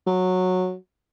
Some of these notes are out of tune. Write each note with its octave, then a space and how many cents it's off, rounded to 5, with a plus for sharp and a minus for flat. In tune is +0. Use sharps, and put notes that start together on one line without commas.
F#3 -10